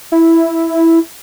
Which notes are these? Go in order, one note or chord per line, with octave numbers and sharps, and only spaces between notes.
E4